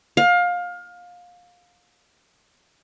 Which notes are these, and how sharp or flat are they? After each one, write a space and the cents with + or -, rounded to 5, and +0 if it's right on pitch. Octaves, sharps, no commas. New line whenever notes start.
F5 +25